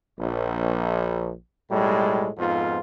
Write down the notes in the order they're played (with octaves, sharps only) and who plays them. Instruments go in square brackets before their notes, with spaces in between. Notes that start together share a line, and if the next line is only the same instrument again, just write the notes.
[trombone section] A#1
B1 A2 G3 G#3
F2 G#2 B3 F4